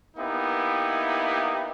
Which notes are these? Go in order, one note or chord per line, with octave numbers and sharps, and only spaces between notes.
A#3 B3 D#4 E4 G4